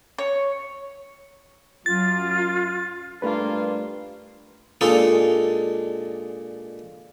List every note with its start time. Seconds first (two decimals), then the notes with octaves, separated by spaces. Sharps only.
0.18 C#5
1.86 F#2 F4 A6
3.22 G2 A3 A#3 F4 B4
4.81 A#2 G#3 D4 D#4 A4